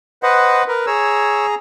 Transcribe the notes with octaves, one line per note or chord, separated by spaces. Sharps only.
B4 C5 D#5 F#5
A#4 B4
G#4 C#5 A#5 E6